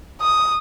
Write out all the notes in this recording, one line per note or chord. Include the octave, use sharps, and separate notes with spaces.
D#6